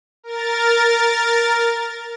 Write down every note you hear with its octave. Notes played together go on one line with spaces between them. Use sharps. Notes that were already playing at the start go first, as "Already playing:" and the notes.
A#4 A6